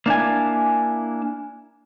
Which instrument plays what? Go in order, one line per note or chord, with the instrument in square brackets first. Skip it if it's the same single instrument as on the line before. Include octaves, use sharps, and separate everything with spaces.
[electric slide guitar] A#3 D4 E4 G#5